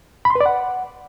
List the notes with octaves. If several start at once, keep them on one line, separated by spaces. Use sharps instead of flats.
B5
C6
B4
D5
F#5